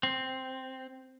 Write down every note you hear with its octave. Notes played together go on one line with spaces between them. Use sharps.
C4